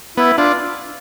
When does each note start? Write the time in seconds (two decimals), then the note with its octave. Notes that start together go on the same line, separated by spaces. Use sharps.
0.17 B3 E4
0.38 D4 F4